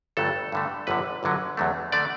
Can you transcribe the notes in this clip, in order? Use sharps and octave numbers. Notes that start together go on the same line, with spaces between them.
G1 G2 F#3 A3 A4
G2 D3 A3
G1 F#2 D3 B4
G1 F#2 D3 F#3
E2 D3 F#3 A3
D3 A3 D5